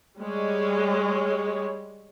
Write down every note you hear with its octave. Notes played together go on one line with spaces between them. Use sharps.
G3 G#3 C#5